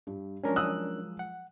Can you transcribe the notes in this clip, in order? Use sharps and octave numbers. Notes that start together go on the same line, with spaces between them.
G2 G4
F3 F#3 G#3 C#4 D4 A#4
D#6 E6 F#6
F#5